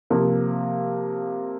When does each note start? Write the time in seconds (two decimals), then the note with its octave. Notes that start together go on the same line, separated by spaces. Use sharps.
0.10 C3 F3 A#3